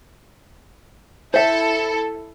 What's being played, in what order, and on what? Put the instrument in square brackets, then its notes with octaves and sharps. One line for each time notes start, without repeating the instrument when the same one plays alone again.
[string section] E4 A4 [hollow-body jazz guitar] C5 E5